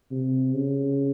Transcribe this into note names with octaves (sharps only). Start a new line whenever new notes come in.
C3
C#3